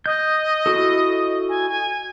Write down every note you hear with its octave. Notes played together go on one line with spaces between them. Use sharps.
D#5 G6
E4 F#4 A4
G#5
G#5